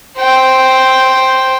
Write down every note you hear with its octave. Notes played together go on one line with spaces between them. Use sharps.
C5 G5